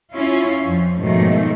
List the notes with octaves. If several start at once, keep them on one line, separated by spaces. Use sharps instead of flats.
C#4 E4 F4
F2
G#2 B2 D#3 F3 F#3 A3